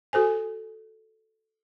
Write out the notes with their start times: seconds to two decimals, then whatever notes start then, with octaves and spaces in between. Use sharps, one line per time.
0.13 F#4 A4 C5 G#5